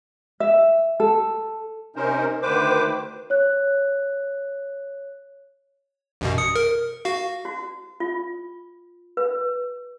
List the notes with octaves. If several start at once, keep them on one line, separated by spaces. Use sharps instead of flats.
E5
A4
C3 C#4 D#4 A#4 C5
D2 D#3 B4 C5 D6
C#5 F#6
A1 F#2 B2
D#6 C#7
A#4
F#4 F5
F#4
F4
B4